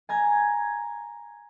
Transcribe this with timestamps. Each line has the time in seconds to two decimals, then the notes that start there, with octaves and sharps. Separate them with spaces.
0.09 G#5 A#5 G#6